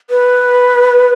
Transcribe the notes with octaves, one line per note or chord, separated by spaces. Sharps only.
B4